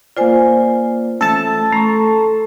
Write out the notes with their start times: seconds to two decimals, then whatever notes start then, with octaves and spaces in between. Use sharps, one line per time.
0.17 A#3 F4 C5 D5 G#5
1.21 E3 A3 C#4 A4 A5
1.73 A3 A#5 C6 C#6